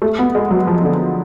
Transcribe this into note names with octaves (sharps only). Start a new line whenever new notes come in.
A3
B3
G#3
F#3
F3
D3